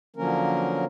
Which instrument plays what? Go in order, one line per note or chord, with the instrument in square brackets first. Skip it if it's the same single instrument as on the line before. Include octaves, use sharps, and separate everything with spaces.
[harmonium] D3 F3 F#3 A#3 C#4 A#4